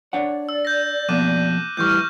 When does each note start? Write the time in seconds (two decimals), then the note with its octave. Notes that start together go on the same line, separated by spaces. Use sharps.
0.13 D4 C#5 D5 F#5
0.49 E6
0.65 G6 A#6
1.09 F2 B2 A#3 D6 F#6 D#7
1.77 A2 E3 G3 C#6 F6 G6